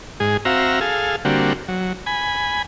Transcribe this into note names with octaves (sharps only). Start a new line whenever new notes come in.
G#2 G#4
C4 F#4 E5 F5 A#5
G#4 A4 F5
D3 G3 A#3 C4 F#4
F#3
G#5 B5